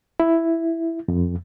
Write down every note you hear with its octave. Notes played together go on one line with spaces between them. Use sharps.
E4
F2